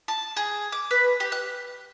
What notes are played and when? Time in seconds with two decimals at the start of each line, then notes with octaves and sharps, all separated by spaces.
0.08 A5
0.36 G#4
0.72 D6
0.91 B4
1.20 G4
1.32 F#6